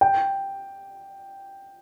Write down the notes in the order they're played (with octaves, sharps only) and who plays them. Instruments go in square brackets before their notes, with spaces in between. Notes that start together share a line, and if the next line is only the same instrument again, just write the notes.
[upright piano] G5